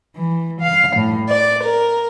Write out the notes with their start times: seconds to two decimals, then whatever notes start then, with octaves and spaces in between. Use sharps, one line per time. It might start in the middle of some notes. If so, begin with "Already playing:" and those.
0.16 E3
0.61 F5
0.97 A2
1.29 D5
1.62 A#4